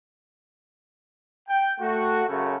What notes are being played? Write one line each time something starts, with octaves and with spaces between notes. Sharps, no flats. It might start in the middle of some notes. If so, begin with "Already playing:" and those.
G5
A3 F#4
F#2 C#3 A3